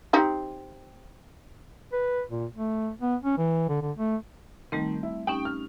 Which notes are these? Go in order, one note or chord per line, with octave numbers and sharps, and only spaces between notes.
C4 D#4 G4
B4
A#2
A3
B3
C#4
E3
D3
D3
A3
D#3 G3 A3 C4
E4
C#4 D#4 G4 G5
F6